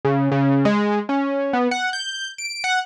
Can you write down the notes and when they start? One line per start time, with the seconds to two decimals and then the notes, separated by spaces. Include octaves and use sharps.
0.05 C#3
0.31 C#3
0.65 G#3
1.09 C#4
1.53 B3
1.71 F#5
1.93 G6
2.38 D7
2.64 F#5